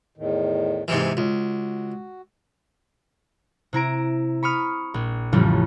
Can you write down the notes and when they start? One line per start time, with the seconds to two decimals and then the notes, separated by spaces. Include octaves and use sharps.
0.18 E2 A2 D#3
0.88 F2 G#2 C3 E3 A#3
1.17 C#2 F#4
3.73 C3 E4 A#5 D7
4.43 B5 C#6 D#6 F6
4.94 A#1
5.32 A1 F2 C#3 E3 G3 A3